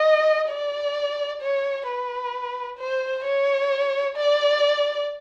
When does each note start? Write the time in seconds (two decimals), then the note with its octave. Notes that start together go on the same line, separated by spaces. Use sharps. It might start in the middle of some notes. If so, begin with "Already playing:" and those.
Already playing: D#5
0.49 D5
1.42 C#5
1.87 B4
2.79 C5
3.24 C#5
4.17 D5